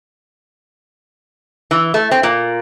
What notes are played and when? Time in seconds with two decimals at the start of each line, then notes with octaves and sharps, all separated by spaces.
1.71 E3
1.94 A3
2.11 C4
2.23 A#2